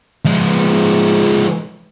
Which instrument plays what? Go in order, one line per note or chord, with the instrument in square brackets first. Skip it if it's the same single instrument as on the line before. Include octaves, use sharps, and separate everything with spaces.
[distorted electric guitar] F3 G#3